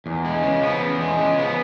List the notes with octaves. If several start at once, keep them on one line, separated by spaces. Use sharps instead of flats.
E2
G#3
C#3
B3
E2
G#3
C#3
B3